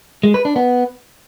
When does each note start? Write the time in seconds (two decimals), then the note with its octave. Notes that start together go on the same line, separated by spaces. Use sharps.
0.23 G#3
0.34 B4
0.45 D4
0.56 B3